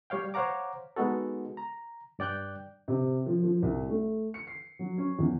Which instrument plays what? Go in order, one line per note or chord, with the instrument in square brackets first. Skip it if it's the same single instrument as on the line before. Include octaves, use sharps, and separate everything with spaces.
[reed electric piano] G3 C#5 F5 G5
C5 C#5 F5 F#5 A#5 D6
G#3 B3 D#4 F#4 A4
A#5
G2 D5 G5 F#6 G6
[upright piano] C3
F3
F3
C2
A3
C#7
C7
F#3
C#4
E2